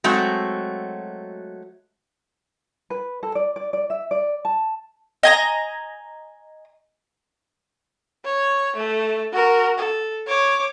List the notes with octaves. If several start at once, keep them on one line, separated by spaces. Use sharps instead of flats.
F#3 G#3 A3 C4 F#4
B4
A4
D5
D5
D5
E5
D5
A5
D#5 G#5 A#5
C#5
A3 A4
F#4 A#4
A4
C#5 D6